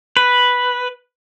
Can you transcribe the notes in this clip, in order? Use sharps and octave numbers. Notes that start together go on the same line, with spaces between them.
B4